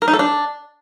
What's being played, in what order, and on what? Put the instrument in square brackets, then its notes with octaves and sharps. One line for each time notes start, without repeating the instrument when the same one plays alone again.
[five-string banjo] A#4
D#4
A4
D4